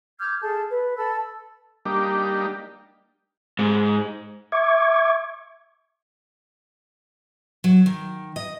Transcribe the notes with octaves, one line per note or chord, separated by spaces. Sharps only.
D6 F6 G6 G#6
G#4 A4 A5
B4
A4 B5 E6
G3 A#3 D4 D#4 G4
G#2
E5 C#6 D6 G#6
F#3
D#3
D#5